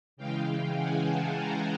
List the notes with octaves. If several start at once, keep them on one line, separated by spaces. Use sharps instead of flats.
C#3 E3 G#3 F5 G5
F5 G5
F#5 G#5
G5 A5
G#5 A#5